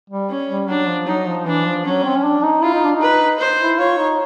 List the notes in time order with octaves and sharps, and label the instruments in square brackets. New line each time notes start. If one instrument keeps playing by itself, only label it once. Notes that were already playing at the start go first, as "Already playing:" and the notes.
[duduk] G3
[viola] C#4
[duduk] G3
[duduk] F#3 [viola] D4
[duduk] F3
[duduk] F#3 [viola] D#4
[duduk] F3
[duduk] E3 [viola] D4
[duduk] F3
[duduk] F#3 [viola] C#4
[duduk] C4
C#4
D4
D#4
[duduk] E4 [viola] F4
[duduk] D#4
D4
D#4
[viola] B4
C5
[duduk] E4
[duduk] F4 [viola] C#5
[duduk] D#4